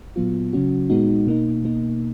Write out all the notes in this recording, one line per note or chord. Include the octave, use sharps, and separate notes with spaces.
A#2 F#3 B3 F4
C#3 F#3 C#4 F#4
A#2 G#3 B3 D#4 F#4
B2 A#3 D#4
B2 A#3 D#4